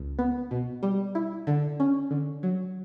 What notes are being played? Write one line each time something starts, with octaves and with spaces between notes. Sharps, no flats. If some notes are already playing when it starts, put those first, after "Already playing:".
Already playing: C#2
B3
B2
G3
E4
D3
C#4
D3
F#3